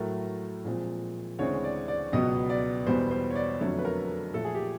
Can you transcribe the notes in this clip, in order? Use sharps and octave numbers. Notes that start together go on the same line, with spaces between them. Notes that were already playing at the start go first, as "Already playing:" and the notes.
Already playing: A2 F#3 A3 A#4
A#2 F3 G#3 C4
D2 C#3 E3 G#3 C4 C#5
D5
D5
C#2 B2 F#3 B3 D#5
D5
E2 B2 G3 B3 C5
C5
C#5
D5
F2 D3 F#3 A3 C#5
B4
A#4
A#2 F3 A3 A4
G#4
G4